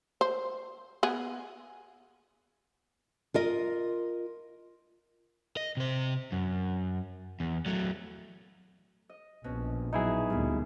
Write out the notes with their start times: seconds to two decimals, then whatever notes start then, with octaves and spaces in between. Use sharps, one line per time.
0.21 C5
1.03 B3 G#4
3.34 F4 A#4 D#5
5.57 D#5
5.77 C3 C5
6.32 F#2
7.40 E2
7.66 F#3 A3
9.09 D#5
9.44 A#1 B2 C#4
9.93 B2 F#3 D#4 E4 G#4
10.30 D2 A#2 G3 B3